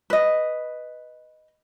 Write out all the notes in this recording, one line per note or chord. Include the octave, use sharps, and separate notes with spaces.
B4 D#5